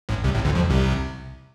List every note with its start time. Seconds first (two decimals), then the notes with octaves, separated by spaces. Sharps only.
0.09 A1 A2
0.24 C2 C3
0.35 A1 A2
0.45 D2 D3
0.55 F2 F3
0.70 C2 C3